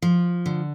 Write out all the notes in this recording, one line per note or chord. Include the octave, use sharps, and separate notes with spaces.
F3
D3